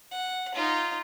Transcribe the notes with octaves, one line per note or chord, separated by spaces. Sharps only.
F#5
D#4 F4